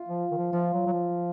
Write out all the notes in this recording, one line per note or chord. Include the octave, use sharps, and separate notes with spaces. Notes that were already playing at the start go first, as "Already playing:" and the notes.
Already playing: F4
F3
D#3
F3
F3 F4
F#3
F#3
F3